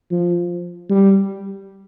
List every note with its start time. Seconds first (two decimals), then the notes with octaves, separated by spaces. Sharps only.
0.11 F3
0.89 G3